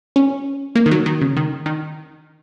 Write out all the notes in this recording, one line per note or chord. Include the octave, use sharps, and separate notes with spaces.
C#4
A#3
D#3
F#3
D#3
C#3
D#3
D#3